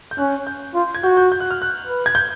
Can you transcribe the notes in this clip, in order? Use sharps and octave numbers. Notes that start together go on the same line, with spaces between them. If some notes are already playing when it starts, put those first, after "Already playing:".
G6
C#4 F#6
G6
F4
G#6
F#4 G6
G6
G6
F#6
F6
F#6
B4
G#6
G6